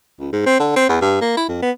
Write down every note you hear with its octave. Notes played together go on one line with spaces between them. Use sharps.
C#2
G#2
C4
D3
C4
E2
G2
A#3
E4
F2
B3